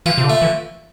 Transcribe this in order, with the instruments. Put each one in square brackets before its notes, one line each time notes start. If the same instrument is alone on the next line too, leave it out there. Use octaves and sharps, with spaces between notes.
[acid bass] E3 [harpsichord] F4
[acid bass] C3
D3
[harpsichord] A3
[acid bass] E3